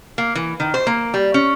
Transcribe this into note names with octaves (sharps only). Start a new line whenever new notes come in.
A#3
E3
D#3
C5
A#3
G3
C#4